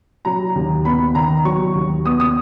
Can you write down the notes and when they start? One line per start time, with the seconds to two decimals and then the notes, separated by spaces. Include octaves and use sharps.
0.25 F#3 A#5
0.55 D#2
0.85 B3 B5
1.15 D#3 A#5
1.45 F#3 C#6
1.75 D#2
2.05 B3 D#6
2.20 D#6